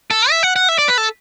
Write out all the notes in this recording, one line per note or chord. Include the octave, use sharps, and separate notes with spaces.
A4
E5
F#5
F#5
E5
D5
B4
A4